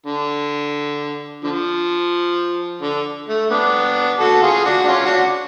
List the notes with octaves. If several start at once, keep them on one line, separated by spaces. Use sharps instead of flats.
D3
D3 F3
D3
A3
B3 D4
F#4 A4
F4 G#4
D4 F#4
D4
C#4 F4
D4 F#4